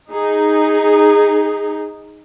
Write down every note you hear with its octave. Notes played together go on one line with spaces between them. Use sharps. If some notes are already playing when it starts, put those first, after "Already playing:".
D#4 G#4